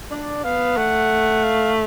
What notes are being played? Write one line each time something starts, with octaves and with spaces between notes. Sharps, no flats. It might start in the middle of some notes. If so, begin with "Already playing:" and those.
D4 D5
B3 F5
A3 F#5
F5